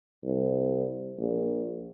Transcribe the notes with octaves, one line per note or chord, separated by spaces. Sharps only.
C2
A#1